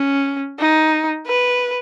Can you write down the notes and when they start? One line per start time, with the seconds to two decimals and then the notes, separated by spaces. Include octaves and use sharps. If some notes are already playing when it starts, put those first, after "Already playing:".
Already playing: C#4
0.59 D#4
1.26 B4